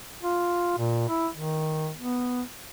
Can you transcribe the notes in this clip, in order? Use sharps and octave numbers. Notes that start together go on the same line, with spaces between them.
F4
A#2
E4
D#3
B3